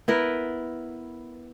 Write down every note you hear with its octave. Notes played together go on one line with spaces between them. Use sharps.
B3 E4 A#4 B4